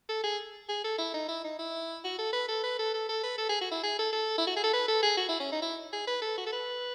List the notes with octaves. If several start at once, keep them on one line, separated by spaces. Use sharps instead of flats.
A4
G#4
G#4
A4
E4
D#4
E4
D#4
E4
F#4
A4
B4
A4
B4
A4
A4
A4
B4
A4
G#4
F#4
E4
G#4
A4
A4
E4
F#4
G#4
A4
B4
A4
G#4
F#4
E4
C#4
D#4
E4
G#4
B4
A4
F#4
A4
B4